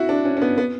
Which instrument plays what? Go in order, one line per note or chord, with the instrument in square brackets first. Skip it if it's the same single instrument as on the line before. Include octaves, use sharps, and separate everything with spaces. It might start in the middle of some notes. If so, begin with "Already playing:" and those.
Already playing: [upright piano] E4 F#4
D4
C#4
C#4
B3
B3